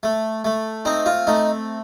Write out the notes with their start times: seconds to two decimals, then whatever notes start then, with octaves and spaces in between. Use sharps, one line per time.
0.03 A3
0.45 A3
0.85 C4 D#4
1.06 F4
1.27 A3 D#4